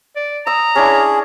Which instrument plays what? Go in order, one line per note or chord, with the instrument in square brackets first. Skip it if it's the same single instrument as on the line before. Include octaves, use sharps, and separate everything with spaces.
[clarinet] D5
[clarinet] A#5 [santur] C#6 D#6 E6
[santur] C#4 D4 E4 [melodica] G#4